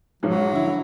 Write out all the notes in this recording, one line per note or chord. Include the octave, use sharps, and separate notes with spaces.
B1 G#2 F3 F#3
D3 E4